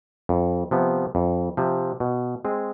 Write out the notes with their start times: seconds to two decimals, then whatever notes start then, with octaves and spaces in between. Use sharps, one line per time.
0.29 F2
0.71 C3 F3 B3
1.15 F2
1.57 C3 F3
2.00 B2
2.45 G#3 C4 G#4